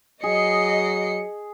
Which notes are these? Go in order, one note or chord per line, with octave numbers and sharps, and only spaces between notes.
F#3 G#4 D#5 C7 C#7